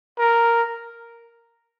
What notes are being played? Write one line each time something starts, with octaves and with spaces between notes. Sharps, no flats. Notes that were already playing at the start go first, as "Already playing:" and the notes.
A#4